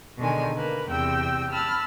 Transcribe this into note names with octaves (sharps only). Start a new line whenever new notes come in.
B2 D3 D#3 G#3 G#5
A#3 B4
E2 C3 G5 E6
A5 B5 E6 F6